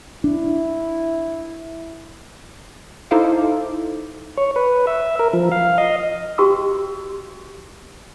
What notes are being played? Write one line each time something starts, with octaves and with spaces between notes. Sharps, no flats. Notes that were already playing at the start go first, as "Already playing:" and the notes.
D4 E4
D#4 E4 A4 C5 F5 D6
C#5
B4
E5
A#4
F3
F5
D#5
F#4 G4 G5 C6 E6